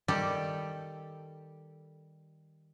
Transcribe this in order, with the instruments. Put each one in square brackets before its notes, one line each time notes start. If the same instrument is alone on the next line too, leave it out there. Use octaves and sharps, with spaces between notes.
[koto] D#3 G3 G4 A4